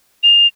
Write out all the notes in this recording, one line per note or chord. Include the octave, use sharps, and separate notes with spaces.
F7